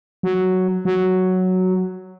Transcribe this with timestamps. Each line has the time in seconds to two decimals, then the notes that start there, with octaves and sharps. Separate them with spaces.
0.23 F#3
0.85 F#3